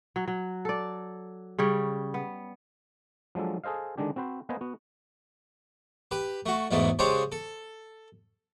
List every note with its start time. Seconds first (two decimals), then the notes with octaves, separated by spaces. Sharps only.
0.16 F#3
0.28 F#3
0.65 A4 D5
1.59 C#3 G3 C#5
2.14 B3
3.35 F3 F#3 G#3 D4 A4
3.64 G#4 A4 C5 D#5 F5
3.98 D3 D#3 G#3 D4 G4
4.16 C4 F#4 B4 C5
4.49 A#3 B3 B4 C5 D#5 G#5
4.61 B3 F#4
6.11 G4 B4
6.46 A3 F#4
6.71 B1 E2 G#2 E3 A3
6.99 C#3 G#3 D4 G4 C5 C#5
7.32 A4